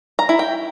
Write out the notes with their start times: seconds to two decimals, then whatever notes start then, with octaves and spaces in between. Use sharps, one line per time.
0.19 A#5
0.29 E4
0.39 G5